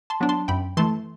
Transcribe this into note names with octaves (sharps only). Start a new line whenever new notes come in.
A5 C6
F#3 B3 D4
A5 C6
F#2 G5 B5
E3 A3 A5 C6